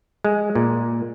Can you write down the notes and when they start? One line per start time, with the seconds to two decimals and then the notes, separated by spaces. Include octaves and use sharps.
0.24 G#3
0.55 A#2